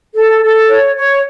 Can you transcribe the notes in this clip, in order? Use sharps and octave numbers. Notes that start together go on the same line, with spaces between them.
A4
A4
C#5
C#5